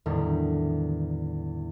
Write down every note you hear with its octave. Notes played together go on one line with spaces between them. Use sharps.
E2 A2 D3 D#3 G3